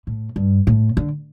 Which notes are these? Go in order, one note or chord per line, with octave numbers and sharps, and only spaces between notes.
A2
G2
A2
D3